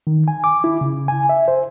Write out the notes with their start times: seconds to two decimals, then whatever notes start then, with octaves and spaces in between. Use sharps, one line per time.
0.07 D#3
0.28 G#5
0.44 D6
0.64 E4
0.81 C#3
1.08 G#5
1.29 E5
1.48 C5